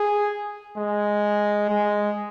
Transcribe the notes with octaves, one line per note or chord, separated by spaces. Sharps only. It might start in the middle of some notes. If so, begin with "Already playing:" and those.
Already playing: G#4
G#3
G#3